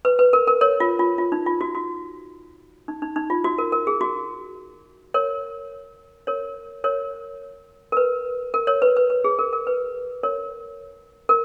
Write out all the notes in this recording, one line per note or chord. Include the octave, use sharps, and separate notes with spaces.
B4
B4
A#4
A#4
A#4 C#5
F4
F4
F4
D#4
F4
F#4
F#4
D#4
D#4
D#4
F4
F#4
A#4
A#4
G#4
F#4
A#4 C#5
A#4 C#5
A#4 C#5
A#4
B4
A#4
A#4 C#5
B4
B4
B4
G#4
A#4
A#4
B4
A#4 C#5
A#4